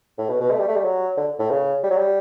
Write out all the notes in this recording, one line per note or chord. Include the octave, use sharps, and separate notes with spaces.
A2
B2
B2
A3
G3
A3
G3
F#3
D3
A2
C#3
G3
F#3
G3